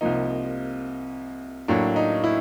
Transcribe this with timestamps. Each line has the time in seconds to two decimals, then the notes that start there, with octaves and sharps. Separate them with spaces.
0.01 C2 C3 F3 A#3 D#4
1.68 A2 F#3 A#3 D4
1.96 D#4
2.24 E4